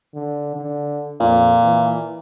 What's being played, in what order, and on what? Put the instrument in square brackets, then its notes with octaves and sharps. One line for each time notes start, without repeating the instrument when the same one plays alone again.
[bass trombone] D3
D3
[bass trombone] F2 [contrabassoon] A#2
[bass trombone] E3